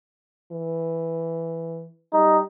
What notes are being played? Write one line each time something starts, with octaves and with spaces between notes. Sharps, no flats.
E3
G3 D#4